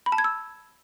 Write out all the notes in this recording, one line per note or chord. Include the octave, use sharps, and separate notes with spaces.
B5
A5
G#6
E6